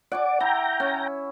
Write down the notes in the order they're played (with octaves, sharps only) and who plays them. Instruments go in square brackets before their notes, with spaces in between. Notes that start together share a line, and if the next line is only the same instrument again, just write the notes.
[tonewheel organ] D5 [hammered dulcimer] F#5 G#5 D6
[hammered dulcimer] E4 [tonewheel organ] G5 A#5
[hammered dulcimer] C#4